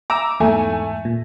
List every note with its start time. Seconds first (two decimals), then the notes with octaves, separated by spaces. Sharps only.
0.10 A#5 D6 E6
0.40 E2 G#2 A3 G#5
1.05 A#2